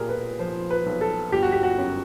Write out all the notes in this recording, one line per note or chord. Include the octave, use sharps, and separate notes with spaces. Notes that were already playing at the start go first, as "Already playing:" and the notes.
Already playing: B1 A#2 G4 G#4 A#4
B4
F3 C5
B4
B1
A4
G1 G4
F#4
G4
F#4
F#2